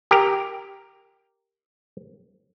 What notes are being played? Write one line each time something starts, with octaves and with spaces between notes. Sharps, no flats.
G4 A#4